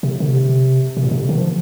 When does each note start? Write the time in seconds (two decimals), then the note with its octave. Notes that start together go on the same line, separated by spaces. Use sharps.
0.03 C3
0.20 D3
0.28 C3
0.97 C3
1.04 A#2
1.11 C3
1.20 D3
1.29 D#3
1.38 F3